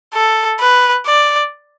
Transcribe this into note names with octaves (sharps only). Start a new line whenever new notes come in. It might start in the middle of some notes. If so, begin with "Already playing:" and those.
A4
B4
D5